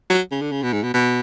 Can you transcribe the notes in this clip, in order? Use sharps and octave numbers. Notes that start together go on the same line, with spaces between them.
F#3
C#3
D3
C#3
B2
G#2
B2
B2